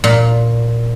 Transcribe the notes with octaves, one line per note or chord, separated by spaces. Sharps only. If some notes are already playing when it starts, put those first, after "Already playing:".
A#2